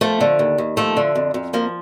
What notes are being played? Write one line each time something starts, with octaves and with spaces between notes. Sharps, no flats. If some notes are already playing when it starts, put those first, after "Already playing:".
F3 A3
D3
D#2
D#2
F3 A3
D3
F2
F2
F3 A#3